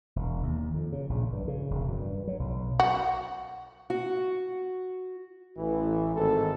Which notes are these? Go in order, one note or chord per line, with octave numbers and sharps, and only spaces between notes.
E1
D#2
F2
C#3
A#1
G2
C#3
E1
F#2
G2
F#3
B1
F#4
F#4
A1 E3
G#1 A4